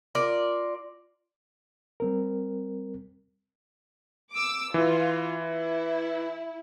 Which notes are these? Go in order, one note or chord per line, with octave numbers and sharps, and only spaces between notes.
F4 A#4 D5
G3 C4 A#4
D6 E6
E3 F4
E4